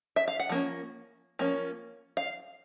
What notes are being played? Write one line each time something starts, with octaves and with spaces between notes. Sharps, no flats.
E5
F5
F#5
F3 A#3 C#4
F3 A#3 C#4
F5